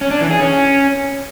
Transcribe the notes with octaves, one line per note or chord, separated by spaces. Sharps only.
C#4
D4
E3
G#4
C#4